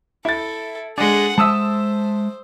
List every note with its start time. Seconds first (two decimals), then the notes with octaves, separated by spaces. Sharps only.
0.25 E4 A4 A6
0.98 G#3 D4 G#4 F#5
1.38 G#3 C5 E5 A5 D#6 E6